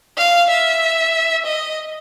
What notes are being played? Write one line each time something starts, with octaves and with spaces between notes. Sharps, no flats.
F5
E5
D#5